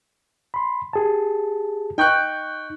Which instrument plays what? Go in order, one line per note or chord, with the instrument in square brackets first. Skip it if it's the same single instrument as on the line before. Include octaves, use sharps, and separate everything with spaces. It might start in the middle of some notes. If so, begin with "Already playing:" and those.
[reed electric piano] B5 C6
G4 G#4 A5
[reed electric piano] D#4 G6 [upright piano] G5 C#6 F#6